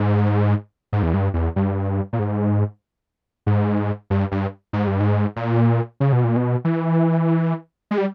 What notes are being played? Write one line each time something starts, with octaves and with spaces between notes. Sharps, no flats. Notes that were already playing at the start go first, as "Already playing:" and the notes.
Already playing: G#2
G#2
E2
G2
E2
G2
A#2
G#2
G#2
G2
G2
G#2
G2
G#2
A#2
C#3
B2
A#2
B2
E3
G#3
G3